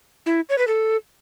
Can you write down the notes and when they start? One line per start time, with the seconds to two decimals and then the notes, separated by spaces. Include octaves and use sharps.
0.26 E4
0.49 C#5
0.58 B4
0.67 A4